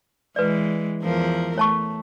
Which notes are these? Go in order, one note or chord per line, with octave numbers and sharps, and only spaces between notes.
E3 G#3 B4 D5
E2 F3 A#4
A3 C#5 A5 C#6